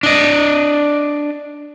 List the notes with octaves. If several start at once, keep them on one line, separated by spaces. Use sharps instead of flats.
D4 D#5